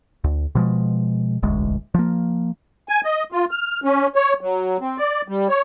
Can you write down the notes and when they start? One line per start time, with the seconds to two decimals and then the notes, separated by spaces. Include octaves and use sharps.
0.24 D2
0.55 B2 F3 G#3
1.43 E1 A1 D2 G#3
1.94 F3 A#3
2.89 G#5
3.05 D#5
3.32 F4
3.51 F6
3.84 C#4
4.15 C#5
4.41 F#3
4.81 C4
4.98 D5
5.28 G3
5.49 C#5